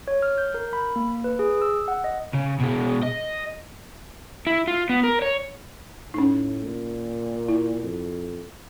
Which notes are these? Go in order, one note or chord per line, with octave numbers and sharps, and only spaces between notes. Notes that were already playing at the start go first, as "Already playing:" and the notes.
C#5
F6
G6
A#4
B5
A#3
B4
G#4
E6
F#5
D#5
C#3
B2 G#3
D#5
E4
F4
B3
A#4
C#5
A2 C#4 D#4
A#2
E4
F2